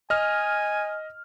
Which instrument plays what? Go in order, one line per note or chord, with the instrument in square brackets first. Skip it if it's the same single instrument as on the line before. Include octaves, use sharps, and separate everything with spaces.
[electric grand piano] D#5 F6 [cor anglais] G#5